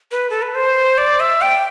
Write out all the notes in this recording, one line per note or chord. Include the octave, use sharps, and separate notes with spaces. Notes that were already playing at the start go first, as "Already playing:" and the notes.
B4
A4
B4
C5
D5
E5
G5